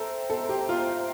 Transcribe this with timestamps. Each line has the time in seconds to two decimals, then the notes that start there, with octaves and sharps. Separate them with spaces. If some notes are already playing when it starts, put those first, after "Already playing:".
Already playing: A4 C5 E5 G5 A#5
0.30 A4
0.49 G4
0.69 F4